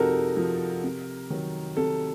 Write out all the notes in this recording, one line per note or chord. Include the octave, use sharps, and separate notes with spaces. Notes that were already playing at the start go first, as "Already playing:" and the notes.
Already playing: C3 F3 D#4 F#4 A4 A#4
F3
C3
D#3 F#3
C3 A4